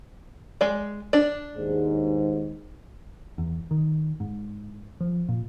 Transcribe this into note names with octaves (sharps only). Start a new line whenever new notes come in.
G#3 D5
D4 D5
D#2 G#2
E2
D#3
G#2
F3
A#2